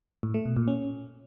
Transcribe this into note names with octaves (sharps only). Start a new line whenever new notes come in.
A2
A3
B2
A#2
C#4